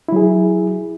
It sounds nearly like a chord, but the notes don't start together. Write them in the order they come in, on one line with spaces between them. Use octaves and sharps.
E4 F#3 G#4